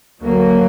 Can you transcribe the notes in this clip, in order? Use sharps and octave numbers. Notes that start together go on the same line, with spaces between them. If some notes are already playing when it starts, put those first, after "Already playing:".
D2 F#3 A#3